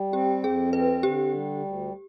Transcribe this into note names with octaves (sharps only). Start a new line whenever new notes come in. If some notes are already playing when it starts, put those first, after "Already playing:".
Already playing: G3
C4 G4
F2 G#4
C4 B4
D3 G4
G3
D2